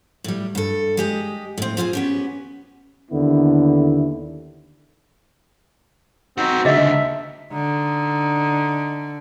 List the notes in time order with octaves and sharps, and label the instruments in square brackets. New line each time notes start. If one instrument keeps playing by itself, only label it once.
[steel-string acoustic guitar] A2 G3
G2 A4
G#3 G4 D#5
A2 C4
C4 F4 G4 G#4
B3 C#4 G4
[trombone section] D#2 D3 B3 E4
[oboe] C4 [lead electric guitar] D#4 F#4
[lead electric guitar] C#2 D3 [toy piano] G#4 D#5 [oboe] E5
[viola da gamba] D3 [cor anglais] D#4